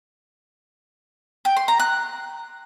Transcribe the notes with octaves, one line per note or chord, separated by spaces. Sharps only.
G5
C6
A#5
F#6